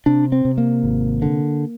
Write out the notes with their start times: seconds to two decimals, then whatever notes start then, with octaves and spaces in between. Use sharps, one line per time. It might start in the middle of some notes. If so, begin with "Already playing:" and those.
0.06 C3 D4
0.32 C4
0.45 C3
0.58 A#3
0.84 G#1
1.22 D3